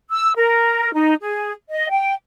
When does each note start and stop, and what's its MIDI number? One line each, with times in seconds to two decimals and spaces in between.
0.10 0.32 88
0.36 0.93 70
0.93 1.14 63
1.21 1.52 68
1.69 1.89 75
1.90 2.14 79